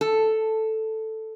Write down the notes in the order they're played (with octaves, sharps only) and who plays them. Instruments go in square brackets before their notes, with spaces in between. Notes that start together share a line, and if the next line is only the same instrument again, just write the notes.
[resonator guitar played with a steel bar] A4